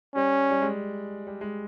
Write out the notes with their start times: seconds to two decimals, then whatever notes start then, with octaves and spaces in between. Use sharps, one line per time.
0.15 G3 C#4
0.51 G3
0.62 G#3
1.27 G3
1.41 G#3